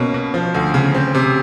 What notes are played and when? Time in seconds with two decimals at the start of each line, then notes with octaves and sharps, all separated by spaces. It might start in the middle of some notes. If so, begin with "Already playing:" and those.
Already playing: B2 A#3 C#4
0.14 B2
0.34 F3
0.54 D2
0.74 C#3
0.94 C4
1.14 C3